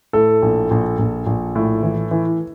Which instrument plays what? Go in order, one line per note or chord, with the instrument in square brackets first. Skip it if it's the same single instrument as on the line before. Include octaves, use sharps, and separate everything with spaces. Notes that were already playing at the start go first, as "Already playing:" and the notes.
[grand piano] A2 A4
A#1
A#1
A#1
A#1
A2
E3
E3